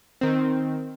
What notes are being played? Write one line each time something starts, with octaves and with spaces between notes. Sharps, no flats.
D#3 C4